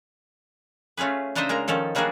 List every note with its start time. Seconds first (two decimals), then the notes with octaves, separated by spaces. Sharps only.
0.97 A3 C#4 F4 G#4 B4
1.35 C#3 D4 D#4 C5 D#5 E5
1.49 G#3 A#3 A#4 A#5
1.68 D#3 F3 C#4 A4
1.95 F#3 G3 A#3 D4 F#4 G#4